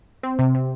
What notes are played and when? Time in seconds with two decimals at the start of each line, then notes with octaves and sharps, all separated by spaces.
0.23 C4
0.39 C3
0.55 C3